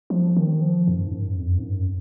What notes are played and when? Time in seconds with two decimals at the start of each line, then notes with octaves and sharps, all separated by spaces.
0.10 F3
0.37 D#3
0.61 F3
0.87 F#2
1.06 G#2
1.13 F#2
1.38 F2
1.58 G#2
1.64 F#2